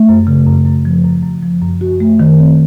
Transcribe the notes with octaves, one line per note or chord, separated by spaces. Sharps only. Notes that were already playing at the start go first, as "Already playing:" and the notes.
Already playing: A3
F#2
C#3
F#2
F#2
F3
F#2
F#2
F3
F#2
F#4
A3
D#3
C4